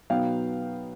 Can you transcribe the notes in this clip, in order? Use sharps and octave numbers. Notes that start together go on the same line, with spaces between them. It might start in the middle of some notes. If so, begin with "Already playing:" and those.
B2 F#3 B3 D#4 F5 G5